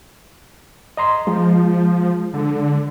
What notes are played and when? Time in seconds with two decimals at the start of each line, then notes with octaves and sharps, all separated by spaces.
0.97 D#5 A#5 C6
1.27 F3 G#3
2.34 D3